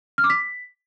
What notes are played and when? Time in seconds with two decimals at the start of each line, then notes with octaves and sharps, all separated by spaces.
0.18 F6
0.24 D6
0.30 B6